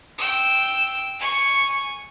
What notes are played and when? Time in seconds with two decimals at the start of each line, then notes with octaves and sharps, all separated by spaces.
0.18 G5 E6
1.20 G#5 C#6